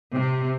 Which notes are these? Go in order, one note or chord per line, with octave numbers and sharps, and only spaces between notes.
C3